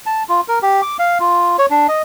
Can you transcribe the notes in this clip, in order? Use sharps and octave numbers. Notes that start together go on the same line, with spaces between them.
A5
F4
A#4
G4
D6
F5
F4
C#5
D4
D#5